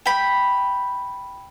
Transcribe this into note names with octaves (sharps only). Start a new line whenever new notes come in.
G5 B5